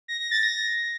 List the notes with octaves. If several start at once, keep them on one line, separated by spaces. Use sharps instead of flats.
A#6
A#6
A6
A#6